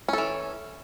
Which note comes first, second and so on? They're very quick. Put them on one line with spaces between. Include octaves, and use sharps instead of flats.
C#4 A4 E3